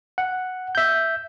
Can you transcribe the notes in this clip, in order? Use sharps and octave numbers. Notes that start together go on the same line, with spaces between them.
F#5
E5 G6